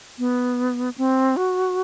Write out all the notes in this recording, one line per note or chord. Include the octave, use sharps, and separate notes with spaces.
B3
C4
F#4